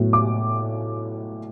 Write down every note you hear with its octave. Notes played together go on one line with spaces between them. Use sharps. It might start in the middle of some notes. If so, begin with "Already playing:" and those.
Already playing: A2 F#3 B3
D6